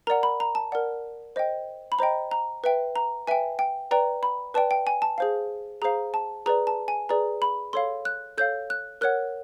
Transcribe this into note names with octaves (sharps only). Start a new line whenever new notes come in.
A#4 D5 F#5 A#5
B5
A#5
A5
A#4 D5 F#5
C5 D#5 G5
B5
C5 D#5 G5 A#5
A#5
B4 E5 G5
A#5
B4 E5 G5 G#5
G5
B4 D5 G5 A#5
B5
B4 D5 G5 A5
G5
G#5
A5
G#4 C5 F5
G#4 C5 F5 A#5
A5
G#4 B4 D5 A#5
A5
G#5
G#4 B4 D5 A#5
B5
A4 C#5 F5 C6
F#6
A4 C#5 F5 G6
F#6
A#4 C#5 F#5 F#6